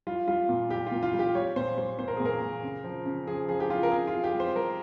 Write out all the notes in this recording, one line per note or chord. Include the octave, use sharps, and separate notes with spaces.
G3 F4
G3 F4
A#2
G3 G4
A#2 F4
F4
G3
G4
G3 C#5
A#2 C5
G3 C5
A#2 C5
A#4
A#2 G#4
A#4
A#2
C#3
F3
C#3
F3 G#4
F3 G#4
G4
F3 F4
A#4
C3 G#4
F4
C3
G4
G3
C5
G3 A#4